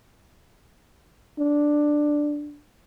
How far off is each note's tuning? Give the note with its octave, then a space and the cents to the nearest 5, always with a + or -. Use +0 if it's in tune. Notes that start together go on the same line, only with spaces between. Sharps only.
D4 +5